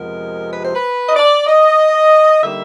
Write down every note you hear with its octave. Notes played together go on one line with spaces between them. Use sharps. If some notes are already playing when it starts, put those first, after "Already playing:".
Already playing: F2 C3 F3 G#3 B3 A#4
B4
C5
B4
D#5
D5
D#5
D3 G3 A#3 D#4 E5